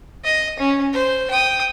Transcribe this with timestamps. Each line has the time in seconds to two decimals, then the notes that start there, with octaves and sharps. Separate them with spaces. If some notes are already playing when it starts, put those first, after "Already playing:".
0.25 D#5
0.59 C#4
0.93 C5
1.30 G5 D#6